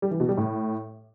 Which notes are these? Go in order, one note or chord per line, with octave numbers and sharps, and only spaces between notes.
G3
E3
B2
G3
A2